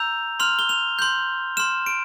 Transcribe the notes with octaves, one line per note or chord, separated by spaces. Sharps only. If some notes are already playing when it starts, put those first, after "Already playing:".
Already playing: A#5 E6 G6 F7
C6 F6 F7
G7
F7
C6 G6
C6 F6 E7
D7